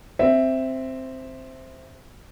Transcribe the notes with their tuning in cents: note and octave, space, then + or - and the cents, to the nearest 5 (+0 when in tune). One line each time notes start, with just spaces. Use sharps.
C4 +0 E5 +0